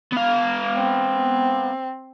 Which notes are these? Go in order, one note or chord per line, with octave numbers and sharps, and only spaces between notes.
B3 F5
C4